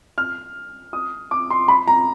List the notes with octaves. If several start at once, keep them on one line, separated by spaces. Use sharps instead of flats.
F6
D#6
D6
C6
B5
A#5